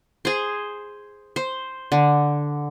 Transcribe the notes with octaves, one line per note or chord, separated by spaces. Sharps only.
G#4 C5
C5
D3